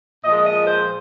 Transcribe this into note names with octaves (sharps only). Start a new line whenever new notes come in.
A#2 F3 G#3 D#5
D#5
C5